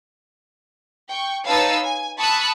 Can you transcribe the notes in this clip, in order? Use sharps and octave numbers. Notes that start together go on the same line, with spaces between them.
G5 C#6
D#4 B4 C#5 F5 A5 E6
G#5
A5 B5 C#6 D#6 E6 F#6